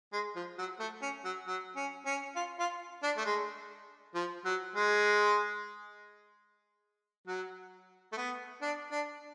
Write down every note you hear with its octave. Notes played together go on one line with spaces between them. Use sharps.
G#3
F3
F#3
A3
C#4
F#3
F#3
C#4
C#4
F4
F4
D4
A3
G#3
F3
F#3
G#3
F#3
A3
B3
D4
D4